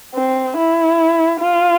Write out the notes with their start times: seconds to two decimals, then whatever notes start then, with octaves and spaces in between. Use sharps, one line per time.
0.14 C4
0.57 E4
1.40 F4